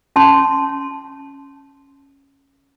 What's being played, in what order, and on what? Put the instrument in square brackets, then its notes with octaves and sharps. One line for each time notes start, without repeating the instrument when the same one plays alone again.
[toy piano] C#4 A5 C6